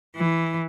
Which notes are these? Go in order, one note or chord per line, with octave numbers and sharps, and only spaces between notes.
E3